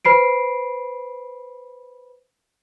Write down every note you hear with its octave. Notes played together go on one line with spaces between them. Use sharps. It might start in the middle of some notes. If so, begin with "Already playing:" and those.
B4 C5 B5 C7 D7